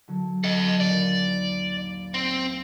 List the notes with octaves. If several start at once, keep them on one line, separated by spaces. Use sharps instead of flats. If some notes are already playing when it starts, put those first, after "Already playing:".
D3 F#3
A4 D#5 F#5
A#1 D#2 D5
C4